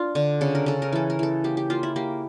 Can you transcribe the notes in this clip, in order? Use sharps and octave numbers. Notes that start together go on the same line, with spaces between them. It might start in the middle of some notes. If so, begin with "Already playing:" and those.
Already playing: D4 F4
D3
C#3 A4
A#4
C#3 A4
A#4
E3 A4
A#4
E3 A4
A#3 G4
G4
A#3 F4
E4
A#3 G4